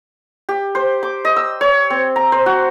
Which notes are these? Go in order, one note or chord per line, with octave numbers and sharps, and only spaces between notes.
G4
C5
D6
D#5
E6
C#5
C4
A#5
C5
F#4